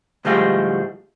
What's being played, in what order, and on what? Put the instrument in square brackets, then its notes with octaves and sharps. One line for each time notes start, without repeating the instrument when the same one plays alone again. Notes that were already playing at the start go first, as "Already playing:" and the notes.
[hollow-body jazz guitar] D2 A2 F3 G3 G#3 F4